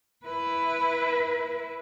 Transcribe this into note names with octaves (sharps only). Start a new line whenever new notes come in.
E4 B4